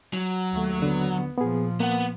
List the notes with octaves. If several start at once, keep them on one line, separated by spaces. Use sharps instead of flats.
F#3
D#2 A3
D3 B3
A#2 F3 B3 G#4
A#3 B3 F#5